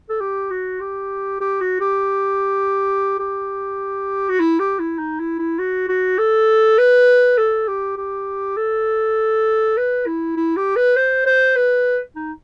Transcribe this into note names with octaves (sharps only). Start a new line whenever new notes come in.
A4
G4
F#4
G4
G4
F#4
G4
G4
F#4
E4
G4
E4
D#4
E4
E4
F#4
F#4
A4
B4
A4
G4
G4
A4
B4
E4
E4
G4
B4
C5
C5
B4
D#4